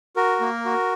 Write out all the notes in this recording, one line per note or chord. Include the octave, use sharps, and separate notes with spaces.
F#4 A#4
A#3
F#4